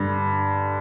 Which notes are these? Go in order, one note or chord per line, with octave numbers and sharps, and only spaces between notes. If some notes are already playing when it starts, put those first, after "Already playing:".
Already playing: G2 D3